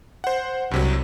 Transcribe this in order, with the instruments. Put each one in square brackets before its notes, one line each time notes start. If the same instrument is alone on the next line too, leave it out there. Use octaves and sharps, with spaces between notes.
[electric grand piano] C5 F#5
[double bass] C2 [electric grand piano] G2 C3 F#3